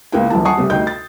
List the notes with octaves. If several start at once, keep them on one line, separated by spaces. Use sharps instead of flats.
C#2 A#3 B3 E4 B4 G5
D#1 A#1 F#2 E3 A5
F#5 G#5 A5 C#6 D#6 C7
C2 C3 G3
D2 D#4 G5 G6
A6